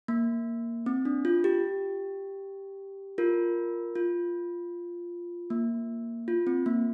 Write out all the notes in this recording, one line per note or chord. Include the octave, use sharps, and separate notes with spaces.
A#3
C4
D4
F4
G4
F4 A#4
F4
A#3
F4
C4
A#3